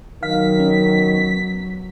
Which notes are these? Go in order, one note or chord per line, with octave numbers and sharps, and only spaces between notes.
D#3 F#3 B3 F5 B6
C#4